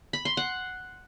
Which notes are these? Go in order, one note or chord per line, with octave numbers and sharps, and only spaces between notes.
B5
C6
F#5